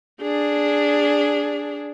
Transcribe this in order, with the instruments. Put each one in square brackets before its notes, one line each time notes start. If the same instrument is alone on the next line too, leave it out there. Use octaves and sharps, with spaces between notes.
[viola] D4 G#4